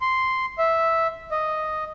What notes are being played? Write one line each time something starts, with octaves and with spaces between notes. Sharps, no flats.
C6
E5
D#5